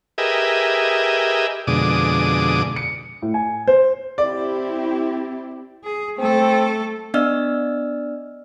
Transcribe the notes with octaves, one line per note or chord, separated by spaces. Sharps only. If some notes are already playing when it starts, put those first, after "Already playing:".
G4 G#4 A#4 B4 D#5 E5
F2 B2 D3 G#3 D6 D#6
C#7
A2
G#5
C5
C4 E4 G4 D5
G#4
A3 C4 A4
B3 D4 D5 D#5 E6 F6